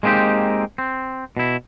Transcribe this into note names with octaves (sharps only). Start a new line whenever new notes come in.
G#3 A#3 C4 D#4 G4
C4
B2 E4